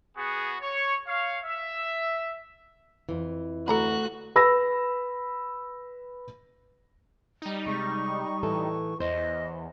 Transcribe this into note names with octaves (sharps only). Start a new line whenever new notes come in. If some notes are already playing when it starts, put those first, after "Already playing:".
B3 F#4 G#4
C#5
C#5 F5
E5
F2 E3
D2 F#4 A4 A#5 B5 F#6
B4 B5 E6 A#6
G3 D#4
C3 G#3 C#6
A2 E3 A4
E2 C5 D#5